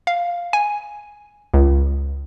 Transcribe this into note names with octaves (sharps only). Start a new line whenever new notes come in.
F5
G#5
C#2